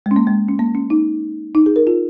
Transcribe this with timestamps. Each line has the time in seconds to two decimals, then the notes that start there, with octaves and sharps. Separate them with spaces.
0.06 G#3
0.11 C#4
0.16 A#3
0.27 G#3
0.48 C#4
0.59 A#3
0.75 C#4
0.90 D#4
1.55 D#4
1.66 G#4
1.76 A#4
1.87 F4